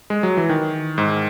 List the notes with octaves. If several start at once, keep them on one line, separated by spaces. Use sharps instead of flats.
G#3
F#3
E3
D#3
G#2